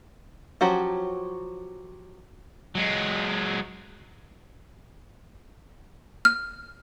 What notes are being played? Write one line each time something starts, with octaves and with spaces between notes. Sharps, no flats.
F3 F#3 C#4 F#4 G4
F#3 G#3
F6